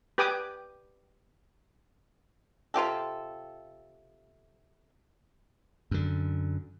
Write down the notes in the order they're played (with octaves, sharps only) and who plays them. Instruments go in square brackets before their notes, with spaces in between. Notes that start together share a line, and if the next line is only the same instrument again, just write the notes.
[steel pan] G4 B4 G#5 D6 D#6
[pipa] C3 F4 G4 A4
[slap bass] F#2 D3